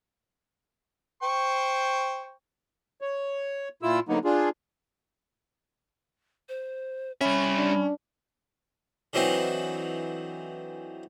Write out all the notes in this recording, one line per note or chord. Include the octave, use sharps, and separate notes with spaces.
C5 G5 C#6
C#5
A#2 E4 F4 E6
D3 F#3 A#3 B3 D#4
D4 F4 G#4
C5
G3 C#4 E5 B5
D4
D3 E3 F#3 C4 D#4